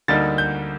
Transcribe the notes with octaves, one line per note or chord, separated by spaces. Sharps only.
D2 D3 G3 A#3 D#4 A6
G6